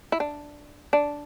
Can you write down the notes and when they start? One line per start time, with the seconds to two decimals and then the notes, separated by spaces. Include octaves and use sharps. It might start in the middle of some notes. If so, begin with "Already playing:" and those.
0.12 E4
0.20 D4
0.93 D4